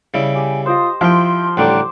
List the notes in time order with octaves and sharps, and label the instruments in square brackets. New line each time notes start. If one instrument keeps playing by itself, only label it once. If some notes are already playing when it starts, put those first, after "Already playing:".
[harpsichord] C#3 G3 E4
[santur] G4 [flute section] G#5
[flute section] F4 D#6 [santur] C5 D#5
[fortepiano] F3 [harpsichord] E4 G5 [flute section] C6
[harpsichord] A1 D3 G3 [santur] C5 D6 [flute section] G5 A#5 F#6